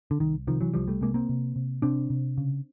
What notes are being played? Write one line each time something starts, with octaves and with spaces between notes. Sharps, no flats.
D3
C2 D#3
C3 D#3 F3
E3 F#3
C2 F3 G3
G3 A3
C3 G#3 A#3
A#3 C4
C3
C3
C3 C4 D4
C3
C#3